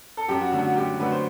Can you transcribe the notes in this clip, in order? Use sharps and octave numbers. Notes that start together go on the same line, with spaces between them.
A4
F#2 G4
F#4
D3 F#3 A3 F#4
F#4
F#2 G4
D3 F#3 A3 B4
C5